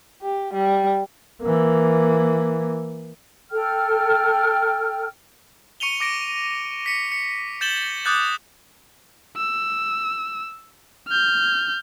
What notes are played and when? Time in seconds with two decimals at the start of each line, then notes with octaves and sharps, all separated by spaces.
0.22 G4
0.53 G3
1.42 E3 A#3
3.52 A4 G5 F6
5.80 C#6 C#7 D#7 F7 G7
6.00 D6 A#6 D7
6.86 B6 C#7
7.12 C#7
7.61 G6 A6 E7 F#7 G7
8.05 D6 D#6 F#6 G6 A6 F#7
9.37 E6
11.07 F6 G6